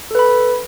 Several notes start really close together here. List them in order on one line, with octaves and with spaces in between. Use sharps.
A4 B4 B5